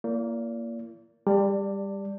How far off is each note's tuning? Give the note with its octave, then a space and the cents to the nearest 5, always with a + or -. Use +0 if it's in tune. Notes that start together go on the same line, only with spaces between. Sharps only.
A#3 +0 E4 +45 D5 -35
G3 +20 D5 +0 A5 +35